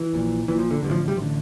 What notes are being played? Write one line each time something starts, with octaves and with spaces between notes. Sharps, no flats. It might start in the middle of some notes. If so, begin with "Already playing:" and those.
Already playing: E3
A#1 A#2
A#1 A#2 E3
F3
D3
A1 G2 D3
F3
G3
A1 D3 F3